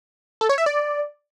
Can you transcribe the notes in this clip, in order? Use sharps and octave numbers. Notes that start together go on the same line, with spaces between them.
A4
C#5
E5
D5